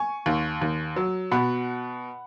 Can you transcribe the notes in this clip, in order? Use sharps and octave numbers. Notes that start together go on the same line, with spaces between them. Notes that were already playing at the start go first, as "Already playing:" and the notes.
Already playing: G#5 C#6
D#2
D#2
F#3
B2 F#5 B5